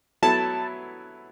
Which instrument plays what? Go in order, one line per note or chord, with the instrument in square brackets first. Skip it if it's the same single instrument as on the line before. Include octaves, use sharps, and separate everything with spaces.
[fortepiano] F#3 B3 E4 A4 [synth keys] A5